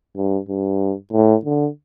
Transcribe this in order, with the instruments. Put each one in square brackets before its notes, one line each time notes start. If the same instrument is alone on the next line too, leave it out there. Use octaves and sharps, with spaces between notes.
[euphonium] G2
G2
A2
D3